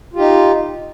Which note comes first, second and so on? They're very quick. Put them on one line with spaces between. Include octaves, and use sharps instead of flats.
F4 G4 D#4